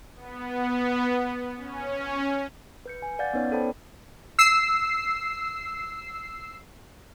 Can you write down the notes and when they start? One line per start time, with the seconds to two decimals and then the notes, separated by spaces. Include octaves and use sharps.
0.16 B3
1.57 C#4
2.86 B4 G6 C#7
3.02 G#5
3.19 D5 F5 F#5 G6 A6
3.33 B3 C#4 D#4 B4 C#5 D5
3.52 A4 C5 C#5 G5 A5 B5
4.39 E6 C7